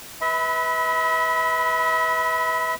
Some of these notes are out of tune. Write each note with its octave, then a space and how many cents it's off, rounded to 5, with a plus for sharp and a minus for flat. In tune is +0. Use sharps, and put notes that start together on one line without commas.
B4 +0 E5 -40 B5 +20